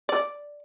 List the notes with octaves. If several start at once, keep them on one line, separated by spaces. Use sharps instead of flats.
D5